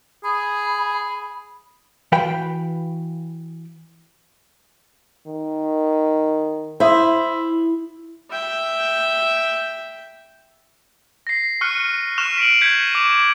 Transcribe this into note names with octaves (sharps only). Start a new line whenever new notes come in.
G#4 B5
E3 F#4 B4 F5 G5 B5
D#3
E4 C5 E5 D#6
E5 G5
A#6 C7
C#6 F6 F#6 C#7 D#7
C#6 F6 F#6 E7 F7
B6 D7 F7 F#7
G6 G#6 B6 C#7
D6 F7